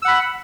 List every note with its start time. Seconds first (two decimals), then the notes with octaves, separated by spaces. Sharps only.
0.02 E6
0.05 F#5
0.08 B5